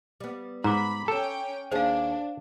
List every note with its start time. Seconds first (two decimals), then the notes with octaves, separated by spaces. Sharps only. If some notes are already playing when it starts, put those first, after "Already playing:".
0.20 G3 B3
0.64 G#2 A#5 B5 D6
1.08 C#4 A4 G5
1.71 D#2 D4 F4 G#4 C5 F5